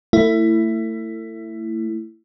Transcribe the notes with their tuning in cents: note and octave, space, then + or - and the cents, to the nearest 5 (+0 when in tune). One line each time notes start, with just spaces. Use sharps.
A3 +35 E4 +10